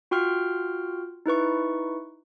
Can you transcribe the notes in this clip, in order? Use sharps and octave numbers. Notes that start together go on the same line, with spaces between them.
F4 F#4 G5 C6 F6
D#4 E4 B4 C#6